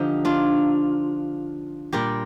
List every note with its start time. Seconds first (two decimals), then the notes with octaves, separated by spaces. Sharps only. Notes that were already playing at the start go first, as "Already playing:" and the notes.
Already playing: D3 F3 D#4 G4
0.25 D4 F4
1.92 A#2 G3 G4 A#4